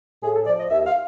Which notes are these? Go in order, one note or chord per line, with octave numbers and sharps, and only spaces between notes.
A2 G#4
A4
F3 D5
D#5
D#2 E5
F5